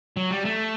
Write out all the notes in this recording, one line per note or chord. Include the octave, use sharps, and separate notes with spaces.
F#3
G3
A3